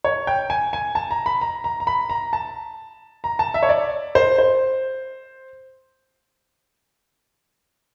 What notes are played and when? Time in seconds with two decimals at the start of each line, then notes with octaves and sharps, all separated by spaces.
0.04 C#5
0.27 G5
0.50 G#5
0.73 G#5
0.95 A5
1.11 A#5
1.26 B5
1.41 A#5
1.64 A#5
1.80 A#5
1.87 B5
2.10 A#5
2.33 A5
3.24 A#5
3.39 A5
3.54 E5
3.63 C#5
3.69 D5
4.15 C5
4.38 C5